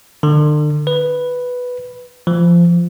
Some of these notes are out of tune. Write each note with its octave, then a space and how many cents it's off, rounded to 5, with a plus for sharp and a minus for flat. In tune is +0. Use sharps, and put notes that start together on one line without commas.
D3 +35
B4 +0
F3 -20